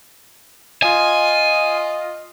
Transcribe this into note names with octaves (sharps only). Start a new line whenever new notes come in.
F4 D#5 G#5